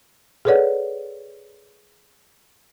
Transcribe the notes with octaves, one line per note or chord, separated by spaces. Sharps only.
G#4 A4 B4 C#5 D5 F#5